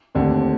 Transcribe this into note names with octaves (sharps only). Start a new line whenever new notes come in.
D#2 D3 A3 C4